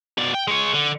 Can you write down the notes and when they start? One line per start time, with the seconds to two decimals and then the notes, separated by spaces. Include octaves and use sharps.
0.18 B2 D5
0.35 G5
0.48 G#3 C#5
0.73 D3